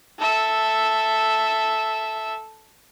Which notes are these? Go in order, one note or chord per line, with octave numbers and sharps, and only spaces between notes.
A4 E5